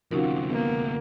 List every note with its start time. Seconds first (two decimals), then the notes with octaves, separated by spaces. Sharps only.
0.11 D2 C3 F3 C#4 D#4 F4 F#4 A#4
0.51 A#3 B3